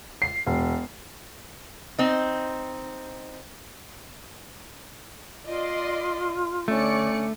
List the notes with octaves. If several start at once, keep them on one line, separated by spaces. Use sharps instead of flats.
C7
E1
C4 D#4
F4 D5 D#5 C6
D3 A3 C#4 D5 C#7